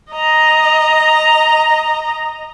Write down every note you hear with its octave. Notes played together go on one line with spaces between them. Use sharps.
D#5 A#5